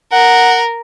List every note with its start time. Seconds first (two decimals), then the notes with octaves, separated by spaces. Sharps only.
0.12 A#4 F#5